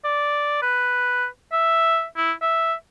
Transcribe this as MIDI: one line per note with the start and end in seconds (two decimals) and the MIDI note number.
0.05 0.62 74
0.62 1.27 71
1.52 2.05 76
2.17 2.32 64
2.42 2.74 76